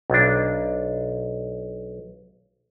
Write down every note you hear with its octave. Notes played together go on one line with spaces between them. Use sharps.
B1 D4